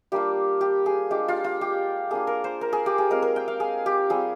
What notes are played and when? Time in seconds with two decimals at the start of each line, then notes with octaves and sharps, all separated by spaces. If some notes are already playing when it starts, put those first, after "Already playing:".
0.12 G3 A#3 D4 F4 G4
0.61 G4
0.86 G#4
1.11 G#3 D4 F4 G4
1.28 F4
1.44 F4
1.61 G4
2.11 A#3 D4 F4 G#4
2.27 A#4
2.44 C5
2.61 A#4
2.73 G#4
2.86 G4
2.98 G#4
3.10 G#3 C4 F4 A#4
3.22 A#4
3.36 G5
3.48 F5
3.60 G#4
3.86 G4
4.10 G3 C4 F4 G#4